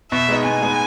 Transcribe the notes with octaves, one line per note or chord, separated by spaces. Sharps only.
B2 E5
G#3 B3 D#4
B2 G#5
G#3 B3 D#4